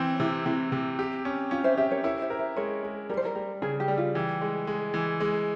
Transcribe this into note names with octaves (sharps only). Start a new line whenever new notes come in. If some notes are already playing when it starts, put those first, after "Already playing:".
Already playing: E3 C4
C#4
C3 E4
C3 E4
C3
G4
C#4
C#4 F4
C5 E5
G4 C5 E5
A#4 C#5
E4 A#4 C#5
C5 E5
A#4
C5 E5
G#3 A#4 C#5
G#3
G3 A#4
C5
A#4
G3
C#3 G#4
G4
G3
F4
E3 G4
G#3
G#3
E3
G#3